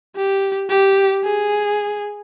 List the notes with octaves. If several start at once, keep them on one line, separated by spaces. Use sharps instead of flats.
G4
G4
G#4